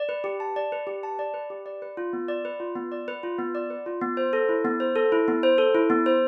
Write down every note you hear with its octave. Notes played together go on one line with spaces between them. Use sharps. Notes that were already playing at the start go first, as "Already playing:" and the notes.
Already playing: D5
B4
G4
A5
D5
B4
G4
A5
D5
B4
G4
D5
B4
F4
B3
D5
B4
F4
B3
D5
B4
F4
B3
D5
B4
F4
B3
C5
A4
E4
B3
C5
A4
E4
B3
C5
A4
E4
B3
C5